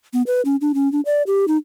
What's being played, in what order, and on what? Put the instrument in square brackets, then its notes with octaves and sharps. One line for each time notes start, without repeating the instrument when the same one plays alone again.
[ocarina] B3
B4
C#4
D4
C#4
D4
D5
G4
D#4